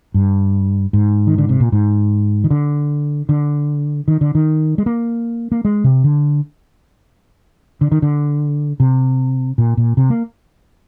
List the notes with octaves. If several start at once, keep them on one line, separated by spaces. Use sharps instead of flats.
G2
G#2
D#3
D3
C3
A#2
G#2
D#3
D3
D3
D#3
D3
D#3
G#3
A#3
A#3
G#3
C3
D3
D3
D#3
D3
C3
A#2
A#2
C3
A#3